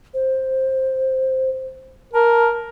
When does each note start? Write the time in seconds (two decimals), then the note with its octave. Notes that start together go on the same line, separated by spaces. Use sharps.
0.14 C5
2.14 A#4 A5